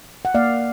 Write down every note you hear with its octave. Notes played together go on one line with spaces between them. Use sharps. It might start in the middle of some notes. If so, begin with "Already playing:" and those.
F#5
A#3 D5 F5